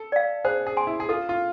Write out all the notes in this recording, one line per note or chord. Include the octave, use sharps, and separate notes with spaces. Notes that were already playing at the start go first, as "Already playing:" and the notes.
Already playing: A4
D5 F5
G#4 C5
G#4
G#5 C6
E4
G#4
F4 A4
F4